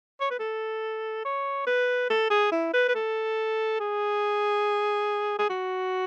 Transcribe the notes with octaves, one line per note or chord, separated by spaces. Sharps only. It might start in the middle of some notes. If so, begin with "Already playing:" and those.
C#5
B4
A4
C#5
B4
A4
G#4
E4
B4
B4
A4
G#4
G#4
F#4